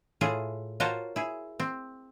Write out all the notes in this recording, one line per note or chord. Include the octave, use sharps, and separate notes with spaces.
A2 E4 F4 G#4
F4 F#4 A#4 C5 C#5 A5
E4 G#4
C4